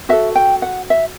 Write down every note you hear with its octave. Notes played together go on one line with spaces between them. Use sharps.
F#4 A4 E5
G5
F#5
E5